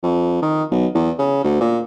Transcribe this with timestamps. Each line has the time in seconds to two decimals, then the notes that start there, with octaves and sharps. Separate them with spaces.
0.03 F2
0.42 D#3
0.71 B1
0.95 E2
1.19 C#3
1.44 D2
1.61 A#2